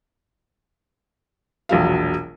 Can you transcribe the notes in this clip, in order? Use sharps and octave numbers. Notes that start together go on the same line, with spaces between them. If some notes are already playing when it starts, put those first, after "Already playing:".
E1 A#1 F#3 F5